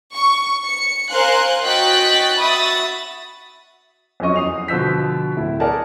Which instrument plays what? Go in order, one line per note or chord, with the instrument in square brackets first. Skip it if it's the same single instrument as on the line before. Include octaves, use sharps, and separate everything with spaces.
[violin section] C#6
C#7
A#4 C5 F5 G#5 C6 F#6
F#4 D#5 G5 F#6 A6 B6
F#4 E5 B5 D#6 A6
[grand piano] F2 F#3 C#4 D#5 C#6
E2 D#6 C7 F7
B2 D3 F3 E6 G6 B6
D1 E4
G#4 A#4 D5 F#5 G#5 A5